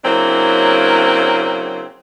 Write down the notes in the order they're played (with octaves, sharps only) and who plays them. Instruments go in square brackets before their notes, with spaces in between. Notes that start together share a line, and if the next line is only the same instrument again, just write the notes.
[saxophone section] C#3 F#3 A#3 C4 D4 E4